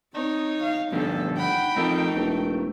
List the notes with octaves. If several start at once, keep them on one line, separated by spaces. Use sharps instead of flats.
C4 D#4 C#5
F5
D2 G2 F3 A3 B3 A4
F#5 G5 B5
F2 A3 D#4 A4 A#4
E1